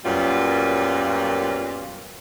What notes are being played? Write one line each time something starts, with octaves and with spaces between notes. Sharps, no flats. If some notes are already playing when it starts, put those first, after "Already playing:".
F#2 A#2 F#3 G3 B3 F4